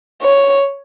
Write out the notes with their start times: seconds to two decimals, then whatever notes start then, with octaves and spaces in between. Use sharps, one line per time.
0.22 C#5